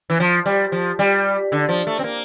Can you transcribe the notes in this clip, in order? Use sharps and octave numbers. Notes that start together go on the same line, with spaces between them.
E3
F3
G3
F3
G3
D3
F3
A3
C4
A#3